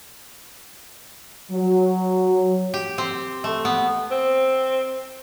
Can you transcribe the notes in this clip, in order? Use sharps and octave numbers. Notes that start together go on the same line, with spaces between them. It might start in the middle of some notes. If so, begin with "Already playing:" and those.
F#3
G4
C4
A3
B3
C4